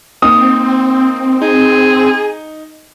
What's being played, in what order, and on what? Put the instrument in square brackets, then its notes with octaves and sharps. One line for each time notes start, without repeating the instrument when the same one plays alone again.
[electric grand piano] A#3 D#4 [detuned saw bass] C4 [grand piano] D#6
[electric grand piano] D#4 [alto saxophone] G#4